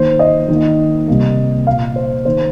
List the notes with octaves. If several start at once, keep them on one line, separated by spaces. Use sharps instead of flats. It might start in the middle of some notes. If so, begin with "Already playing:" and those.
Already playing: D#3 A#3 C5
D#5
D#3 A#3
C3 G3 A#3
A#2 A#3 F5
C5
D#3 A#3 C5